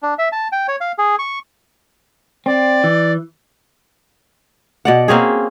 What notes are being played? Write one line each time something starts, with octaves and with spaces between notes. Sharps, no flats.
D4
E5
A5
G5
C#5
F5
G#4
C#6
C4 D5
E3
B2 D5 F#5
A#3 C4 C#4 G#4